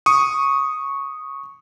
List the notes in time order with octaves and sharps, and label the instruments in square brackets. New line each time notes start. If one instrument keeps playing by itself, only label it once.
[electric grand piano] C#6 D#6